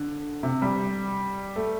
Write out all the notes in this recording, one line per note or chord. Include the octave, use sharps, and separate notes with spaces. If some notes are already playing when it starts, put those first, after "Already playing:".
Already playing: D3
C3
G3
A3